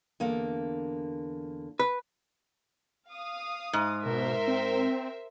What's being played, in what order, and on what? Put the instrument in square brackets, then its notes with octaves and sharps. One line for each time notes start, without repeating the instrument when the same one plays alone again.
[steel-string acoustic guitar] E2 D3 A#3
[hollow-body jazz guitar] B4
[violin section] F5 D#6
[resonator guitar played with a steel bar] G#2
[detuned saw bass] B2 [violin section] A#4 C5 E5
[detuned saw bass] C4